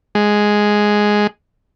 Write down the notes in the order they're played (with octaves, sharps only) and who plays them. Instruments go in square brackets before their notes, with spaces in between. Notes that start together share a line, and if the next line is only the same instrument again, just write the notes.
[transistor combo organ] G#3